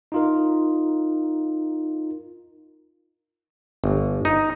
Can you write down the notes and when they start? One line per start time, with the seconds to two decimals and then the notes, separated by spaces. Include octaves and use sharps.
0.12 D#4 F4 A#4
3.84 G1
4.25 D#4